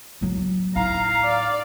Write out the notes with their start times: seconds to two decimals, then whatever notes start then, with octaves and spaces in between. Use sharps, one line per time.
0.21 A2 F#3
0.76 A2 D#4 F5 A#5
1.24 D5